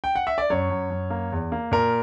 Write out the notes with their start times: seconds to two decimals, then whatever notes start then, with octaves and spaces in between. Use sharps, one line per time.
0.04 G5
0.16 F#5
0.27 E5
0.38 D5
0.50 F#2 C#5
0.70 F#2
0.90 F#2
1.10 A#3
1.32 E2
1.52 A#3
1.72 A#2 A#4